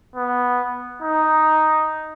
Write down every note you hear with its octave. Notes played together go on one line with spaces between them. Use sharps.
B3
D#4